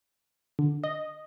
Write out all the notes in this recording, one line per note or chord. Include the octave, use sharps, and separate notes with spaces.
D3
D#5